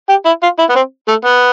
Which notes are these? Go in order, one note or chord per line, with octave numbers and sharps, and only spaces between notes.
G4
E4
F4
E4
B3
C4
A3
B3